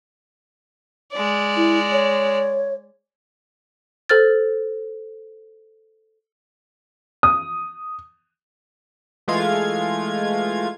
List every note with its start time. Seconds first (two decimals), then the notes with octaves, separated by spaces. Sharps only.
1.13 G#3 D5
1.56 E4
1.92 C#5
4.09 A4 C5 F6 A6
7.23 D#6
9.28 E3 G#3 A3 F4 F5 G#6